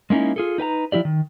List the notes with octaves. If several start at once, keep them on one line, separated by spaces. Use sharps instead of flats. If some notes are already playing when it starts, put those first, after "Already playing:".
G#3 A#3 C#4 D#4 E4
F4 G#4 A4
D#4 B4 G5 A#5
F3 E4 G4 D5
D#3